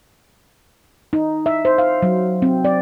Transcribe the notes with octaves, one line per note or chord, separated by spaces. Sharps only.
D#4
E5
C5
F5
F#3
C4
D5